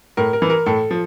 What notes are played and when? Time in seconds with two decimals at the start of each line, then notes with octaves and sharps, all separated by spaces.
0.17 A2 A#4
0.33 A#4
0.42 E3
0.50 A#4
0.66 A2 A4
0.91 F3